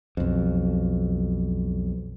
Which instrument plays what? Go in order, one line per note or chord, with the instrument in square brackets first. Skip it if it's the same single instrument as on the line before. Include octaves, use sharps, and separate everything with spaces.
[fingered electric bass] B1 F2